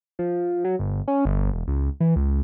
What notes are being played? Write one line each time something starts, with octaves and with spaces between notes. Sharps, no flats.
F3
F#3
G1
C#4
G1
E1
C#2
E3
C#2